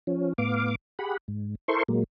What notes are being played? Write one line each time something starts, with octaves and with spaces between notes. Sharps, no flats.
F3 C#4
A2 B3 F5 D6
G4 G#4 F#5 B5
G#2
E4 A4 A#4 C5 C6 C#6
A#2 F#3 G#3 A#3